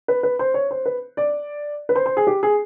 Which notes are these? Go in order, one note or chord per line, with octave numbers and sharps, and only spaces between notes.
B4
B4
C5
C#5
C5
B4
D5
B4
C5
C5
G#4
G4
G#4